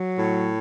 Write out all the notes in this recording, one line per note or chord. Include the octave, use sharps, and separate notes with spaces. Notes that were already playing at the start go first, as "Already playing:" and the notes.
Already playing: F#3
A2